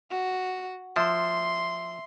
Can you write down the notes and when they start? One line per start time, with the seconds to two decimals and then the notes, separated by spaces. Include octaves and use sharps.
0.11 F#4
0.96 F3 E5 C6